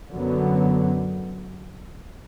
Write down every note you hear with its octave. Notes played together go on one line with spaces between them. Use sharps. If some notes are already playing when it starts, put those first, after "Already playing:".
F#2 D3 F#3 B3